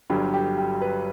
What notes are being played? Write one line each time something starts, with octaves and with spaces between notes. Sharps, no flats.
G1 G2 D3 F#3 G4
G4
G4
B4